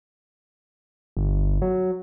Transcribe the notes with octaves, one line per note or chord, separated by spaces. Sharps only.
G1
F#3